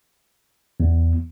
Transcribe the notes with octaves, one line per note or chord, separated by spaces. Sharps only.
E2